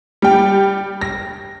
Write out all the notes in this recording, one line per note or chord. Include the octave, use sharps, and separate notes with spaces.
G3 G5
A#6